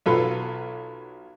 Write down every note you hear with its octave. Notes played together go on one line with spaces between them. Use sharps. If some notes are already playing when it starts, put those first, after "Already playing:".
B1 F#3 F4 A4 B4